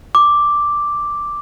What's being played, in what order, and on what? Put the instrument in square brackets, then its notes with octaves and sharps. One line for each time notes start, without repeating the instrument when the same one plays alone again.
[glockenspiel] D6